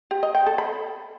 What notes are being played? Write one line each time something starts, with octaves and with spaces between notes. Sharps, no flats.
G4
D#5
G5
A4
B5